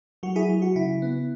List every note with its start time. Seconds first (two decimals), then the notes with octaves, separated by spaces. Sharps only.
0.23 F#3 F#4
0.36 E4 G#4
0.49 F#3
0.62 F#4
0.76 C#3 E4
1.02 B3